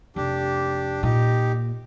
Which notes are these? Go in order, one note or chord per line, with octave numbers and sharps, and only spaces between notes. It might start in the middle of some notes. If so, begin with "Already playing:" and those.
F1 D4 G4
A#2 D#4 G4